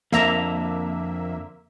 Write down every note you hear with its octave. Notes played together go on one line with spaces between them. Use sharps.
F2 D3 A#3 E5 A#5